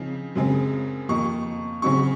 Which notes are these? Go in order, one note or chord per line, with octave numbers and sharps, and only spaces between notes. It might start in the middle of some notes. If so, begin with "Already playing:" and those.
Already playing: C#3 F3 C4 D#4
F#2 C#3 G#3 C4
F2 D#3 A#3 D#4 C#6
C#3 F#3 C4 D#4 C#6